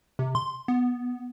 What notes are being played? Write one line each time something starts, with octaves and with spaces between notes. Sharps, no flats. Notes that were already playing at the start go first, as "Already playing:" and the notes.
C3
C6
B3